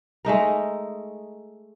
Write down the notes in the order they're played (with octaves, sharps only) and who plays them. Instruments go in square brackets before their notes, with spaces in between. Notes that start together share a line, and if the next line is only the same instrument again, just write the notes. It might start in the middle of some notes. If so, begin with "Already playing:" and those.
[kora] G#3 A3 D#4 A#4